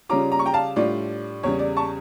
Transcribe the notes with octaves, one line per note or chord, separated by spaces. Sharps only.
C#3 G3 C#4 F4 A#5 D6
A#5
C#6
G5 A#5
F5 A5
A2 G3 D4 F4 D5
E2 C#3 G3 C#5
D5
A5 C#6